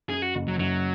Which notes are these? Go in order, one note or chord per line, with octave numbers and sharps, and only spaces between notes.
F#2 G#4
F#4
F#1
F#3
F#2 F#3